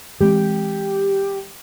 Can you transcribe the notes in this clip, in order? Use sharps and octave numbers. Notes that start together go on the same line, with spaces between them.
E3 G#3 C4 G4